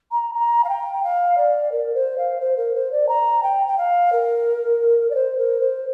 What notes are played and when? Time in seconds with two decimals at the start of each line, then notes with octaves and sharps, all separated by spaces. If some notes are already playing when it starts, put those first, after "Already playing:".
0.11 A#5
0.35 A#5
0.64 F5
0.69 G5
1.03 F5
1.37 D5
1.72 A#4
1.94 C5
2.17 F5
2.40 C5
2.57 A#4
2.74 C5
2.92 D5
3.08 A#5
3.43 G5
3.67 G5
3.77 F5
4.12 A#4
5.10 D5
5.14 C5
5.38 A#4
5.60 C5